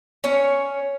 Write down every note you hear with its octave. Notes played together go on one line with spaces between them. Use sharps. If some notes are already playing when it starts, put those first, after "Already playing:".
C#4 C#5